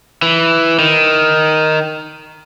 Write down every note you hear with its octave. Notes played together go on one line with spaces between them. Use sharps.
E3
D#3